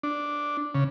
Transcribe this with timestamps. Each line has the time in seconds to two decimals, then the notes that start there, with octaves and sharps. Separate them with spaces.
0.03 D4
0.75 C#3